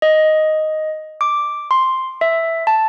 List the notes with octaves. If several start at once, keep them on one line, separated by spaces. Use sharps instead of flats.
D#5
D6
C6
E5
A5